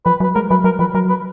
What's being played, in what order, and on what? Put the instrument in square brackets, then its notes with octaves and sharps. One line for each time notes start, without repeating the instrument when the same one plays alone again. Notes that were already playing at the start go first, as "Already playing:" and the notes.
[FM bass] F3 [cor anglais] B4
[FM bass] F#3
[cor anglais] B4
[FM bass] G#3 [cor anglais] A#4
[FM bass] F#3 [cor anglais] B4
[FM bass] F#3 [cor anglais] A#4
[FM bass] F3 [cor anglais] B4
[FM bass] F#3 [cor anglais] A#4
[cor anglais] B4